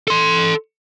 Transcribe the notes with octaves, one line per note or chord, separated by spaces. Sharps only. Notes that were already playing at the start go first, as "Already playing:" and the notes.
A4 C6